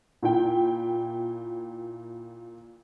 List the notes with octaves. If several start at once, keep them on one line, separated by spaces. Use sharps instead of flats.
A#2 E4 G5